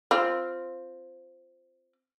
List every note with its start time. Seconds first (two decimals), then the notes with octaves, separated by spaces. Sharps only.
0.11 C4 F4